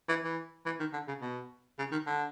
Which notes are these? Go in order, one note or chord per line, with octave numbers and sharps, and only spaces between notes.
E3
E3
E3
D#3
D3
C#3
B2
C#3
D#3
D3